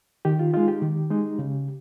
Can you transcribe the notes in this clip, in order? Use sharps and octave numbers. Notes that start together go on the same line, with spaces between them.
D#3 G4
F4
G#3 D#4 F4
G4
D#3
G#3 D#4
C#3